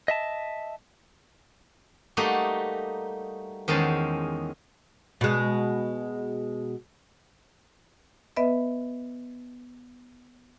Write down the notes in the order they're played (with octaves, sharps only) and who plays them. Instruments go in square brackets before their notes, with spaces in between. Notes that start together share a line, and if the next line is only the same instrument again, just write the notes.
[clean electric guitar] D#5 E5 A5
[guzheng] G3 A3 A#3 D#4 F#4 G4
E2 D#3 G#3 C#4 C5 A5
[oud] B2 G#3
[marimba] B3 B4 D#5 E5